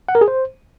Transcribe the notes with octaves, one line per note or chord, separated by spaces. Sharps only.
F#5
A#4
G#4
C5